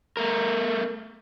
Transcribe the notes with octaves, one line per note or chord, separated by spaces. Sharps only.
A3 A#4